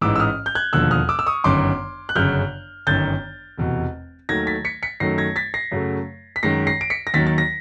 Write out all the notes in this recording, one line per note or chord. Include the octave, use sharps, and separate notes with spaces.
A1 G#2 E3 D6 E6
E6
D#6 F6
G6
F#6 G#6
E1 D#2 D3 F3 E6 F#6
D#6 F6
D6 E6
E6
C#6 D#6
G1 F#2 D#3 C6 D6
F#6
G1 F#2 C#3 F6 G6
G1 F#2 D#3 G6 A6
F1 E2 B2
D#2 D#3 F#3 A3 G#6 A#6
A6 B6
B6 C#7
B6 C#7
F#2 D#3 F#3 A3 A#6 C7
G#6 A#6
A6 B6
A#6 C7
F#2 C#3 F#3 A3
B6
F#2 D#3 G#3 A#6 C7
A#6 C7
D7
B6 C#7
A#6
D#2 D#3 F#3 A6 B6
A6
A#6